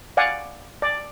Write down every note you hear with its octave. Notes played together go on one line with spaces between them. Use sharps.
D5 F5 F#5 G#5
D5